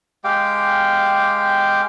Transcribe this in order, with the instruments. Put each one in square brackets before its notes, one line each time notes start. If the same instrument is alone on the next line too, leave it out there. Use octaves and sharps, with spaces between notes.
[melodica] G#3 G4 F5 G5